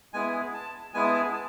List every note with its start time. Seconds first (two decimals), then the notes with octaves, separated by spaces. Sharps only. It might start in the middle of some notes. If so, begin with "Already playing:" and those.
0.13 G#3 B3 E4 G#4 G#5
0.54 A5
0.94 G#3 B3 E4 G#4 G#5
1.04 A5
1.13 G#5
1.34 A5